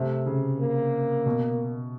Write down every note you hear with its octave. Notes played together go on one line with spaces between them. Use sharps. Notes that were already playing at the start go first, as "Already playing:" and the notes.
Already playing: C3 A3
C#3
A#3
B2